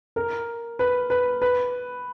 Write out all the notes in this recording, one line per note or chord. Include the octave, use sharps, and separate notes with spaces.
A#4
B4
B4
B4